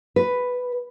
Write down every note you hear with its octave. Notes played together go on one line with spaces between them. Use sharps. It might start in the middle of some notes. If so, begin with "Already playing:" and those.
B4